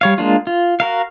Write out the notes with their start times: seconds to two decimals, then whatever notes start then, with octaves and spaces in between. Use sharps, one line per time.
0.01 G3 C#5 F5
0.18 G#3 A#3 D4 F4
0.47 F4
0.80 F#4 A#4 F5